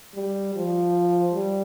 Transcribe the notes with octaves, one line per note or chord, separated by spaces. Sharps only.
G3
F3
G3